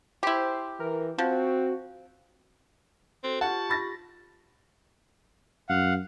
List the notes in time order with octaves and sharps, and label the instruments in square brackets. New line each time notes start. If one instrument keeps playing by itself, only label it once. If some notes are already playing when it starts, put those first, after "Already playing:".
[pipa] E4 G4 [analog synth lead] C5
[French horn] E3 [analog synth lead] A#4
[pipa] F3 [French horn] C4 [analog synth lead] F#4
[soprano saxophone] C4 [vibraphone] F#4 A4
[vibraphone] F4 G4 C#6 [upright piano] F#5 [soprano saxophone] A5
[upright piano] B5 A6 A#6
[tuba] F#2 [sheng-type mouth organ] F5 F#5